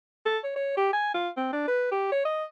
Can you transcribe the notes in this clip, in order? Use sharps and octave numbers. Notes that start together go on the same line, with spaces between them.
A4
C#5
C#5
G4
G#5
F4
C4
D4
B4
G4
C#5
D#5